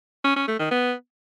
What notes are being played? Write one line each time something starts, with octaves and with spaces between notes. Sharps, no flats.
C#4
C#4
A3
D#3
B3